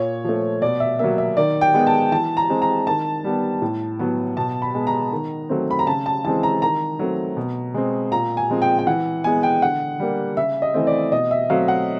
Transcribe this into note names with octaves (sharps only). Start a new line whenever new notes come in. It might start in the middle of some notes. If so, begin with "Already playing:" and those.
Already playing: A#2 C#5
F3 A3
B2 D5
E5
F#3 A#3 E5
E5
D#3 D5
G5
G#3 B3
A5
E3 A5
A#5
G#3 C4
A#5
D#3 A5
G3 B3
A2
F#3 B3
B2 A5
B5
G#3 B3
A#5
D#3
F#3 A3 C4
B5
A#5
C#3 A5
A5
E3 G#3 C4 A5
A#5
D#3 A#5
F#3 A3 C4
B2
G#3 C4
A#2 A#5
G#5
F3 G#3 C4
G5
G5
E3 F#5
G#3 B3 G#5
G5
D3 F#5
G3 A#3
C#3 E5
D#5
E3 A3 C4
D5
B2 D#5
E5
F#3 A3 C4 F5
F#5